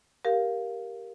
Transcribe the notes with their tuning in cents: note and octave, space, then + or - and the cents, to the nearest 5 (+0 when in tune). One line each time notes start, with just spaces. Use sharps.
G4 +0 A#4 +5 F5 +5